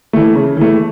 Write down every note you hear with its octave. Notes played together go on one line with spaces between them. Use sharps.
E3 A3
C#3
E3 A3